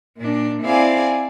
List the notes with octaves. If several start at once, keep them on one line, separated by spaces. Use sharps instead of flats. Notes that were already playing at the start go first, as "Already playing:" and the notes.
A#2 D4
C4 E4 G#4 D5 F5 G#5